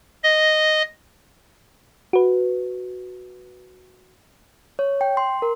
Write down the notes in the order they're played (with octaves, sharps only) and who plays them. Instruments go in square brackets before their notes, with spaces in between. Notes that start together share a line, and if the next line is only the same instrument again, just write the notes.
[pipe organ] D#5
[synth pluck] F#4 B4
[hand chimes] C#5
G5
C6
A#4